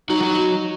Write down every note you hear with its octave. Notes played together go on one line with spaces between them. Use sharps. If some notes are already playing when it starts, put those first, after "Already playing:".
F#3 D#4 F#4
F#3 F#4